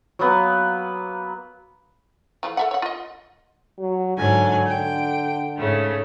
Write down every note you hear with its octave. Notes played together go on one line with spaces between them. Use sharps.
F#3 A#3 B3 B4
E3 F3 A3
A4 E5 F#5
C#5 F#5
F4 D#5
F#3
G#2 D3 F#3 G#5
D3 G5
G#2 C#3 A3